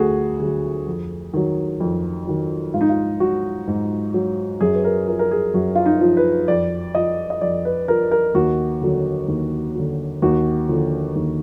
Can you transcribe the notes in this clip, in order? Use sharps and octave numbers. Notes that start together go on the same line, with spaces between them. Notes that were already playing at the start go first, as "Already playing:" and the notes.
Already playing: D2 D3 F#3 F#4 G#4
D3 F#3 G#4
F2
D#3 F#3
F2
D#3 F#3
G#2 F4
D#4
F4
F#3 F#4
G#2
F#3
F#2 G#4
B4
A#4
F3 A#4
A#4
G#4
F#2 F#4
F4
D#4
F3
B4
F2 D5
F3 D#5
D#5
F2 D5
B4
F3 A#4
A#4
D#2 F#4
D3 F#3
D#2
D3 F#3
D#2 F#4
D3 F3
D#2